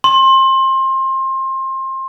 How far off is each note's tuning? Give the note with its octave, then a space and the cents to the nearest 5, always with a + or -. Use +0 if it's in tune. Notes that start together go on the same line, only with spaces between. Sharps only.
C6 +25